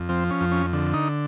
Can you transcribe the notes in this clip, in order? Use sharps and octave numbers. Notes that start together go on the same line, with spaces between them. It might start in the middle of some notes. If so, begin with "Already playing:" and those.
Already playing: F2
F3 C4
C#4
F2
C#4
D3
D#4